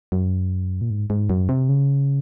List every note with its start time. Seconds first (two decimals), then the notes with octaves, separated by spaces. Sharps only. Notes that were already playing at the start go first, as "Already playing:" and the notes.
0.12 F#2
0.81 A#2
0.90 G#2
1.10 G#2
1.30 F#2
1.49 C3
1.69 C#3